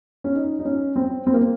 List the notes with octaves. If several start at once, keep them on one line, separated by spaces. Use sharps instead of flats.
C#4
D#4
D#4
C#4
C4
C4
A#3